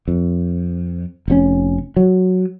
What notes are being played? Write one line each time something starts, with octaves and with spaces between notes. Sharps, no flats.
F2
F1 B2 C#4
F#3